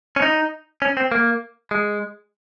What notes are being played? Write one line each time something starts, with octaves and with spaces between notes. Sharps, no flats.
C#4
D#4
C#4
C4
A#3
G#3